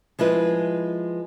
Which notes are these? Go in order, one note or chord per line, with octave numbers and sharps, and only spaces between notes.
F3 G#3 E4 B4